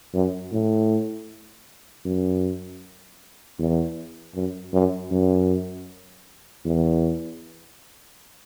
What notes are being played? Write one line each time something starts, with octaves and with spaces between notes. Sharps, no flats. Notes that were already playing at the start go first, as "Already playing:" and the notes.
F#2
A2
F#2
E2
F#2
F#2
F#2
E2